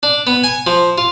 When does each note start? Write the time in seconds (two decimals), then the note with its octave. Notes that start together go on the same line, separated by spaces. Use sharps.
0.03 D4
0.27 B3
0.44 G#5
0.67 F3
0.98 F4